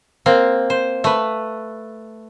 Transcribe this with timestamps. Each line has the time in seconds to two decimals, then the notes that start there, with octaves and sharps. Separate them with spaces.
0.26 A#3 C4
0.70 C5
1.04 A3 B4